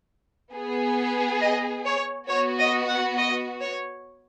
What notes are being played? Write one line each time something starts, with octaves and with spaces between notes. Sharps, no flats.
B3 G#4
D#5
C#5
B3 F#4 C#5
D#5
F#5
D#5
C#5